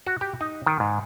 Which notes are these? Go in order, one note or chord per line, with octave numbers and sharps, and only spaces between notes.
F#4
G4
D#4
D#3
G#2